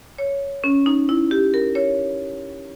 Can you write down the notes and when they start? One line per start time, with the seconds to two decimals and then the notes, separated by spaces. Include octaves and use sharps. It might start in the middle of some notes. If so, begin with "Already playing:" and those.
0.18 C#5
0.64 C#4
0.86 D#4
1.09 E4
1.31 G4
1.54 A#4
1.75 C#5